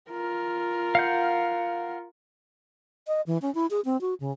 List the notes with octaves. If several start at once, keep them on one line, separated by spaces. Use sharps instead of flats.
F4 A#4
F5 F#5 G6
D#5
E3
C#4
E4
G#4
C4
F#4
C#3